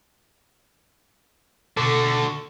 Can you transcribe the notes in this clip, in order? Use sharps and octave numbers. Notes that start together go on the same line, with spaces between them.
B2 D3 F#4 A4